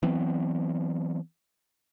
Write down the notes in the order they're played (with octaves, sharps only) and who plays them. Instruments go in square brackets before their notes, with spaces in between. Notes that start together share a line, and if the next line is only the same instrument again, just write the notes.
[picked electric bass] E3 F#3 B3 C4